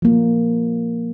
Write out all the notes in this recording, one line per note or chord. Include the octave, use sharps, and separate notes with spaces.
F3 A#3